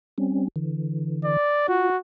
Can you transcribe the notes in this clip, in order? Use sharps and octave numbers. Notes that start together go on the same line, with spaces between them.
G3 C4 C#4
D3 E3
D5
F4 F#4